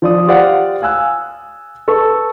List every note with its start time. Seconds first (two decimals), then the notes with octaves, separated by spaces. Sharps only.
0.02 F3 D5 D#6
0.27 G4 C5 D5 F5 F#5
0.82 F5 G#5 E6 F#6
1.88 A4 B4 C#6